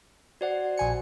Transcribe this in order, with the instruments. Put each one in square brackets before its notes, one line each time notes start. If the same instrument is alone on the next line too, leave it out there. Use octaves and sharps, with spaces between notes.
[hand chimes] F#4 C5 F#5 [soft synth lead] D5
[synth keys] A#1 G#5 C#7